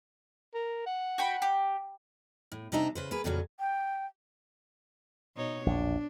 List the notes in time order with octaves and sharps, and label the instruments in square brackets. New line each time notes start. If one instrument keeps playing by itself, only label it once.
[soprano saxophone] A#4
F#5
[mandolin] F#4 G5 B5
G4
[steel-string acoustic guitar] A2
C3 D4 D#4 D#5 E5 A#5
C#3 B4 C5
A#3 G#4 B4
F2 A#2 C#3 F#3 C#4
[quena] G5
[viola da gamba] B2 D#4 C#5
[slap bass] A#1 E2 [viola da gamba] D4